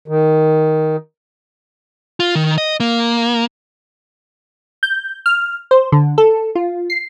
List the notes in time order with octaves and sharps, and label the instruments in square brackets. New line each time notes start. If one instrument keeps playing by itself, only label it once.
[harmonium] D#3
[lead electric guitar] F4
D#3
D#5
A#3
[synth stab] G6
F6
C5
D3
A4
F4
C7